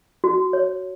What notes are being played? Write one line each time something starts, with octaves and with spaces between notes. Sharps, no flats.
F#4
C#5